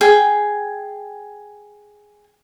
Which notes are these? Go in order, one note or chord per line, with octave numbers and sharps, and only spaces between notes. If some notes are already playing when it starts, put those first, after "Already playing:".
G#4 G5